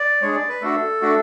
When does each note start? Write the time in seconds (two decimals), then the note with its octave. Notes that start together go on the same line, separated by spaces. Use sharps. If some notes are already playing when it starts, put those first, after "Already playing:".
Already playing: D5
0.22 G#3 D4 G#4 C#5
0.35 D5
0.49 B4
0.62 A3 D4 F#4 A4
1.01 A3 D4 F#4